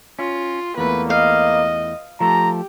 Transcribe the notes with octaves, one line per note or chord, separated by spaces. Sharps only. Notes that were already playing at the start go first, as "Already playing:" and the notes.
C#4 F4
E2 A3 A#3 B4
D#5 F5
F3 A3 G4 A4 A#5